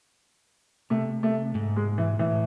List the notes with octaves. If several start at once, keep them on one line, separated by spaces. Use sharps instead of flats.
C3 A3
A3
G#2
G#3
E3
A2 E3